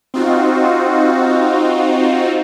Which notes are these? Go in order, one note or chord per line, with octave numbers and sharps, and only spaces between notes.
C4 D#4 F4 F#4